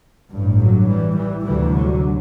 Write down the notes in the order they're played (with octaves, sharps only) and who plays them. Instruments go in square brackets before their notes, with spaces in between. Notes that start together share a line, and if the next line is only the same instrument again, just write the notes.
[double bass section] A1 G2
D3 F#3
E3 G3
E3 G3
D2 C3 E3 G3
D3 F#3